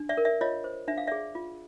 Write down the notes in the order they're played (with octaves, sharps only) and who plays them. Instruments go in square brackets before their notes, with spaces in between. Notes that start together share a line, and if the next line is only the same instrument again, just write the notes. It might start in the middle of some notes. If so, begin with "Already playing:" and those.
Already playing: [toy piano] D4
D5 E5
A#4
D5 E5
F4 C#5 D#5
C5
D4 E5
F5
G#4 D5 E5
F4